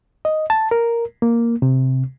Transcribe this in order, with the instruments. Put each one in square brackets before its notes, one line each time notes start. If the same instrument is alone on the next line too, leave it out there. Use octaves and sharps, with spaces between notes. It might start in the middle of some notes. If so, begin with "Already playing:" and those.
[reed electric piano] D#5
A5
A#4
A#3
C3